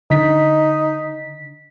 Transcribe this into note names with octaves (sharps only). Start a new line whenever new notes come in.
D3 D#4 B6